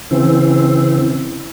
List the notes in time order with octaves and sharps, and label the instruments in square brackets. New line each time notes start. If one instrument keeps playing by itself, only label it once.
[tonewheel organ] C#3 E3 C4